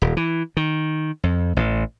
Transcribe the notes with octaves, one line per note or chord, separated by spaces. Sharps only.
D#1
E3
D#3
F2
A1